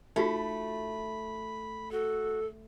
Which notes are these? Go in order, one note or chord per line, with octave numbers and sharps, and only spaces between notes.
A3 D#4 F4 F#4 B5
F#4 A4